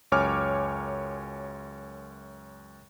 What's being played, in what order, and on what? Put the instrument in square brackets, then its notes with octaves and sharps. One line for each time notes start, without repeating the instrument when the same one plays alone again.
[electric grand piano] C#2 F#2 C#5 G#5 D6 F6